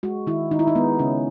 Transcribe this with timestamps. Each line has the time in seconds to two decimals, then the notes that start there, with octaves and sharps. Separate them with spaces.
0.03 G#3 F#4
0.27 D#3 E4
0.51 D#3 D#4
0.59 E4
0.68 D#4
0.75 G#3 B3
0.99 C#3 C#4